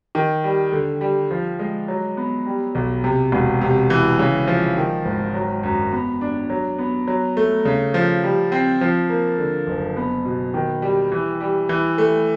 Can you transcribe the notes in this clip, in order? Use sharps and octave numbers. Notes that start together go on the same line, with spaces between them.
D#3
G3
D3
G3
F3
G#3
F#3
B3
G3
B1
C3
E1
C3
E3
C#3
F3
D#3
G#1
F#3
F#2
B3
D4
F#3
B3
F#3
A3
C#3
F3
G3
C4
F3
A#3
D3
F#1
B3
B2
D#3
G3
E3
G3
E3
A3